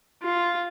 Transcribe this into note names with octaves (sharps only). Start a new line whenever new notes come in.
F4